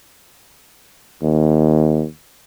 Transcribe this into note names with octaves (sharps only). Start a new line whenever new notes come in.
D#2